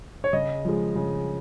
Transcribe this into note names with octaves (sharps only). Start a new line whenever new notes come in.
C#5
C#3 D#5
F3 G#3
C#3